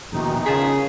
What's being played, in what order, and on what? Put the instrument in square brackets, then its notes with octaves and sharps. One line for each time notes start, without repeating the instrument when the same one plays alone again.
[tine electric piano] A#1 D#2 B2 [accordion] D#3 E3 D#4
[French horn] C#3 [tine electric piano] F4 A5 B6 [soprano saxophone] G#4